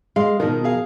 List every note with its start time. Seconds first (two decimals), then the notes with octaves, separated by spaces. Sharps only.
0.16 G#3 F5 C6
0.40 B2 D#3 F3 A#4
0.64 G#4 F5